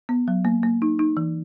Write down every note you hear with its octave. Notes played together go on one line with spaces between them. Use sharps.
B3
F#3
A#3
A#3
D#4
D#4
E3